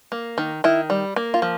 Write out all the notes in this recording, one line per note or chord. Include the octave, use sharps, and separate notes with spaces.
A#3
D#3
D#3 E4
G3
A#3
F4
F3